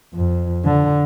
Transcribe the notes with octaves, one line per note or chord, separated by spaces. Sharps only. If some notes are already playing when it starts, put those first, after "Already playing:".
F2
D3